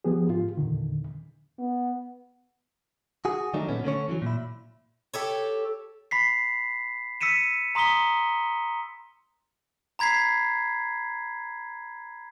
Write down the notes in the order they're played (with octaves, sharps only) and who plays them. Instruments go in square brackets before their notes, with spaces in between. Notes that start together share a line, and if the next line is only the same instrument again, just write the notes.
[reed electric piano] F3 B3 G4 G#4
G#2 F4
E2 A#2 D3 D#3
[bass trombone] B3
[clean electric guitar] F#4 G#4
D#3 F#3 A3 D4 D#4
A#2 B3 C#4
D3 A3 C#4 C#5
E3 F#3
A#2 E4
[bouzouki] G4 A4 C#5
[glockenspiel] B5 B6 C7
E6 B6 C#7 D#7 E7
A#5 C6 D#6 B6 G7
A#5 B5 G#6 B6 C7